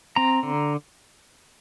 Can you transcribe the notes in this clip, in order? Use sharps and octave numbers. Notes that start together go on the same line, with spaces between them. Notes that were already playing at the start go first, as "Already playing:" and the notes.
C4 A#5
D3